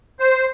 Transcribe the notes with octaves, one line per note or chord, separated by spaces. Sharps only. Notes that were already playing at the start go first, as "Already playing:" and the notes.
C5